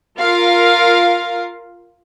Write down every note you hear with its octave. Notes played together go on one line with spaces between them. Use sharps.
F4 A#4 F5